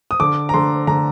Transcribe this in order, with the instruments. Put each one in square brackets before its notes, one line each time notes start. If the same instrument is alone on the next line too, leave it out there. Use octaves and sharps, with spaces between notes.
[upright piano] D#6
D3 D6
A#5
D3 C6
D3 A#5